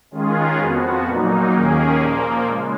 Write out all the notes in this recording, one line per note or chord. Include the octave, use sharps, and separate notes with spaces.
D#3 G#3 C#4 F4 G#4
F2 F3 B3 F#4
A#2 F#3 A#3 D#4
D#2 D#3 A#3 C#4 G#4
A#2 F3 A#3
C#3 G#3